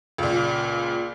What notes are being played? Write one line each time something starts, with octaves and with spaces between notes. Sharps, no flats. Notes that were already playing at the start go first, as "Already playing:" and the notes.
C#2 A#2